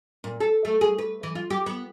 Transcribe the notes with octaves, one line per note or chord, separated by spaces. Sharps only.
A#2
A4
A3
G#4
B4
E3
F4
G4
B3